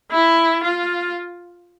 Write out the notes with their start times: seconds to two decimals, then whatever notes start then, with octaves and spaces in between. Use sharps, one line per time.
0.11 E4
0.64 F4